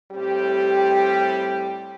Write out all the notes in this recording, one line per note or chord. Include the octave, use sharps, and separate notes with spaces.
A2 G3 C4 G4